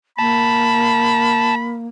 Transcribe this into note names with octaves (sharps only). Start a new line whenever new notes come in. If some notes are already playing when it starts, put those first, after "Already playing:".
A#3 A5 B5